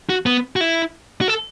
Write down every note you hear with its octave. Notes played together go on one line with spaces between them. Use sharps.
F#4
B3
F#4
E4
F#4
A4